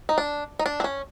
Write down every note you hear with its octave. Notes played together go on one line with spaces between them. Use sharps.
D#4
D4
D#4
D4
C4
C#4